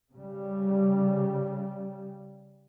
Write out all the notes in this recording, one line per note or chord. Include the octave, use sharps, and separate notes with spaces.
C#3 G3